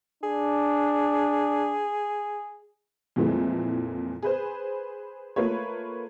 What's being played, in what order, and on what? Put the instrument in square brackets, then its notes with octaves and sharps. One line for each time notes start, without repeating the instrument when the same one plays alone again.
[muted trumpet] D4 [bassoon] G#4
[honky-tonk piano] F2 A#2 E3 G#3 A3
G#4 B4 C5
A3 A#3 F4 B4 C#5